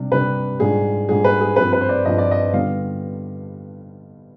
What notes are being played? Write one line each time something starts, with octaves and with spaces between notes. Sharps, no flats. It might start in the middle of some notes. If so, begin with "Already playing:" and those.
Already playing: C3 G3 D4
C3 G3 D4 B4
G#2 G3 D4 F4 G#4
G#2 G3 D4 F4 G#4
B4
G#4
G2 F3 C4 B4
B4
C5
D5
G2 F3 C4 D#5
D5
D#5
D3 G3 B3 F4 F5